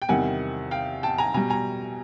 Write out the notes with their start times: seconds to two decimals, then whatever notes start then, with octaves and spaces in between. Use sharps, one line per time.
0.02 G5
0.09 E2 C3 D#3 G3 F#5 G#5
0.71 F5 G5
1.03 G5 A5
1.18 G#5 A#5
1.34 B2 G3 G#5 A#5
1.50 G#5 A#5